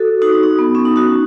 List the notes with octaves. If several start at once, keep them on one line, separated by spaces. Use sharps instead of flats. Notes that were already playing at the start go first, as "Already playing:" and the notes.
Already playing: F#4 A4
D#4 F#4
D#4
D#4
B3
C#4
D#4
D#4 F#4